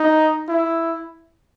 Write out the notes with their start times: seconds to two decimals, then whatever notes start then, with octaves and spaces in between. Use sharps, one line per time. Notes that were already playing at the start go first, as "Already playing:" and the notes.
Already playing: D#4
0.48 E4